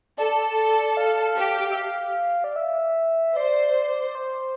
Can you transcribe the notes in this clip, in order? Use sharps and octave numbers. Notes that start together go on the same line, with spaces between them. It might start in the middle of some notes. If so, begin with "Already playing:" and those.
A4 D5
F5
G4
E5
F5
D5
E5
C5 D5
C5